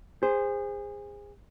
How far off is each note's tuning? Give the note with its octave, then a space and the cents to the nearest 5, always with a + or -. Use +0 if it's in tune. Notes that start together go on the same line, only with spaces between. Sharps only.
G#4 -30 C5 +0